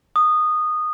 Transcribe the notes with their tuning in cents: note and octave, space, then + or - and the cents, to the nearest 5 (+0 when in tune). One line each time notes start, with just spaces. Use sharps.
D#6 -15